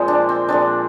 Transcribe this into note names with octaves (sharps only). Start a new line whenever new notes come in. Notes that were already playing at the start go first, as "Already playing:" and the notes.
Already playing: A#2 F3 G#3 C4 C5
D4
C4
A#2 F3 G#3 C4 D4